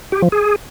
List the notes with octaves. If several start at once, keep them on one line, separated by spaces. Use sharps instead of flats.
G4
F3
G#4